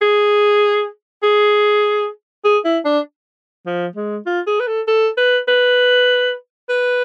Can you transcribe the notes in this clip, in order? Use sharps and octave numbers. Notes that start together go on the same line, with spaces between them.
G#4
G#4
G#4
E4
D4
F3
G#3
F4
G#4
B4
A4
A4
B4
B4
B4